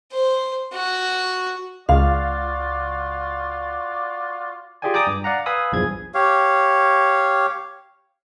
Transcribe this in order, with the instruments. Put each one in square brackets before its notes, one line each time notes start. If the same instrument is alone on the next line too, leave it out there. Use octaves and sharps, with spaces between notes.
[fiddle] C5
F#4
[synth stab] C#2 [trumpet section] F4 F#4 D5 [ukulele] F5
[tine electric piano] F4 G4 G#4 D5 G5 G#5
D5 G5 A#5 D6 D#6
G2
D5 F5 F#5 A#5
B4 F5 G#5 B5 D#6 E6
B1 E2 G2 F3 G#4 G#6
[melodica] G4 C#5 F5